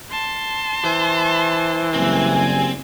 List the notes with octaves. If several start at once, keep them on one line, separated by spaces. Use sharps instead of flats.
A5 C6
E3 C5
F#1 G3 C4 G#5